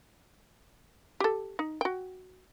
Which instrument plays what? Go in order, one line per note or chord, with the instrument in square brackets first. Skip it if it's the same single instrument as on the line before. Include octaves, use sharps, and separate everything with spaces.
[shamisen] G4 A4
D#4
F#4 G5